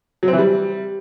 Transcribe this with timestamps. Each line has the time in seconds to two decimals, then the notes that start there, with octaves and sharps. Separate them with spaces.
0.23 F#3
0.28 C4
0.33 E3
0.38 G3